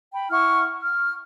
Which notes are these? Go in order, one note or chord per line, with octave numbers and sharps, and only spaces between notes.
G5 B5
E4 F#5 C#6 F6
F6